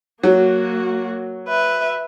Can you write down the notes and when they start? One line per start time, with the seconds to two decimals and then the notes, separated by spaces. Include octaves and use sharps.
0.23 F#3 A#3 F#4
1.48 B4 E5